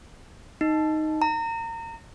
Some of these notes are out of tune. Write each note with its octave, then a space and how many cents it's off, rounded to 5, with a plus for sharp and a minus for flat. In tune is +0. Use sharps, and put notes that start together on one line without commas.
D#4 +0
A#5 -30